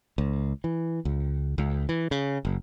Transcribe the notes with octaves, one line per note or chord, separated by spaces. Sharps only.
C#2
E3
C#2
C#2
E3
C#3
F#1